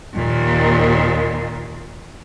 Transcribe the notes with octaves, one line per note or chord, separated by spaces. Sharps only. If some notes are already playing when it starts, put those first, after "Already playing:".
D#2 A#2